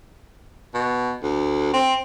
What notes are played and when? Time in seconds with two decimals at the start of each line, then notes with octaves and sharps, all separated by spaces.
0.74 B2
1.23 D2
1.73 C4